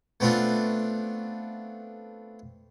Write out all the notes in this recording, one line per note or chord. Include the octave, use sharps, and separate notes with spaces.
A3 B3 C4 D4 F4